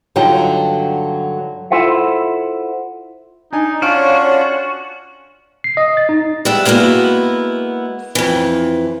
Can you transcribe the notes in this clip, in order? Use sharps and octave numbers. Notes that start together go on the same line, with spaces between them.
G2 D3 F#3 D#4 F4 G5
E4 F4 A4 C5 E5 F#5
D4 D#4 G#5
C#4 D4 F4 F#4 C#5 F5 F6 D7
C7
D#5
A6
D#4
G3 G#3 E5 F#5
G#3 A#3 B3 E4 F#4
F2 E3